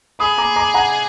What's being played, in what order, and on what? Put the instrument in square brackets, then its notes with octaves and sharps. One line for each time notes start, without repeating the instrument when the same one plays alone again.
[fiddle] G#4 [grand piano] B5 D#6
[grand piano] A#5 D6
A#5 D6
F#5 A#5